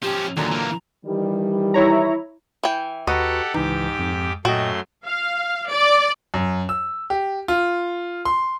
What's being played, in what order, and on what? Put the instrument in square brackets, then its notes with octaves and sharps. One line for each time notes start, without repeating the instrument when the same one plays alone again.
[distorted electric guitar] F3 C#4 [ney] G4
[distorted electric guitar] D#2 [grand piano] A#2 D3 F#3 [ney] A#5
[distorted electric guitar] E3 A#3
[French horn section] D#3 E3 G3
[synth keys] E4 C#5 A#5
[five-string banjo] E3 G5
[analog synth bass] D#2 [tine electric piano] F#4 B4 A#5 [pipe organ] G4 A4 F#5 [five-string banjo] D#5
[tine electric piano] C#2 E3 [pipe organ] G#2 G4 D6 [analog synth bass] D#4
[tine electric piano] F2
[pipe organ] F#2 A3 C6 [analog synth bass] A#2 [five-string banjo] F#4 [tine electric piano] D#5 G5
[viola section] F5
D5
[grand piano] F#2
E6
G4
F4
C6